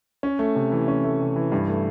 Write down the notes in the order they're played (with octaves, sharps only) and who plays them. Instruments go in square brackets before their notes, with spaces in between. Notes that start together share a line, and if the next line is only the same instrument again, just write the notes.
[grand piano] C#4
A3
C3
E3
C#4
A3
C3
E3
G2
A3